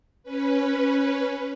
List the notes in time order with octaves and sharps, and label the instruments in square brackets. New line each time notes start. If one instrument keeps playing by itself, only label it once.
[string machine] C#4 B4